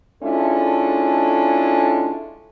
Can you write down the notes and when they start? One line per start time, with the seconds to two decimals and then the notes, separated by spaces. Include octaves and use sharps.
0.23 G#3 C#4 D4 E4 F4 A4